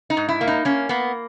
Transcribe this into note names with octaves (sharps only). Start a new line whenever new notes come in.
D#4
G#2
E4
A#3
D#4
A#3 C#4
A#3 B3